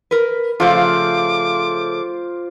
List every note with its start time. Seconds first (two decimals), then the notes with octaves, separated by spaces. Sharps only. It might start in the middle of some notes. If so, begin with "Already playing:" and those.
0.11 A#4 B4
0.60 C#3 F3 A3 F4 C5 D6